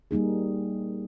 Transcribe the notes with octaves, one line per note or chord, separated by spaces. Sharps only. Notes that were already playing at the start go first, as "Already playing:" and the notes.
G3 A#3 D#4 G#4